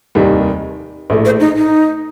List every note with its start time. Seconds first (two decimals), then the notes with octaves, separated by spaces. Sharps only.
0.15 F1 D#2 D#3 G3
1.10 A#1 A2 A3
1.25 C5
1.40 D#4
1.56 D#4